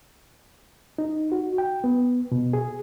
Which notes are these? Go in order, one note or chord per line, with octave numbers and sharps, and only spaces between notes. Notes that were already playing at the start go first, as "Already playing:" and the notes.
D#4
F#4
G5
B3
B2
G#4